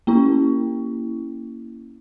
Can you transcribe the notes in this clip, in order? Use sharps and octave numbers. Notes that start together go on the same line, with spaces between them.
A#3 C#4 E4